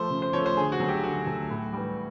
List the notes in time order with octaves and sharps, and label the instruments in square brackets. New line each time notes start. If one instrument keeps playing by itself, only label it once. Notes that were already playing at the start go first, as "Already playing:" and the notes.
Already playing: [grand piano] F3 A3 C5
C#3
C5
F3 A3 C#5
C5
D3 G#4
F#4
F#3 A3
G4
D3 F#4
F#3 A3
A2
E3 G3